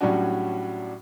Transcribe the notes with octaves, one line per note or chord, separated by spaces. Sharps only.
A2 F#3 G3 C#4 D4 F#4